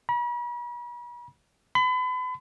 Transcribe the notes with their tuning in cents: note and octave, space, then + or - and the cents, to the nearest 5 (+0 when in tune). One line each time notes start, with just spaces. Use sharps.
B5 -45
B5 +35